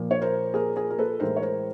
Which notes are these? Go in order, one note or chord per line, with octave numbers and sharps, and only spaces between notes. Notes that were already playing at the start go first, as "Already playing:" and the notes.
Already playing: A#2 F3 A#3
C#5
A#4 C5
G#4 A#4
G#4 A#4
A#4
A4 B4
A2 E3 G#3 A#4 C5
C#5
A#4 C5